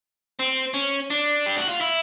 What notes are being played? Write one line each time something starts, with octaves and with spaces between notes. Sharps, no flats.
C4
C#4
D4
G4
F#4
F4
E4